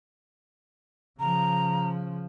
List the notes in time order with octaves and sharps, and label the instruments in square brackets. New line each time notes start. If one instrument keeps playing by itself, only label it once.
[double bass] C#3 F3 [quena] A#5